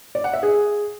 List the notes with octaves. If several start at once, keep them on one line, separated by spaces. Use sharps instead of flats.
D5
F#5
E5
G#4